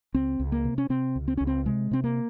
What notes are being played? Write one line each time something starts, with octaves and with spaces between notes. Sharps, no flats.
C#2 C4
C#2
A#3
C3
C#4
C3 C4
C#2
C4
C#2 C#4
C4
C3 G#3
C3 C4
A#3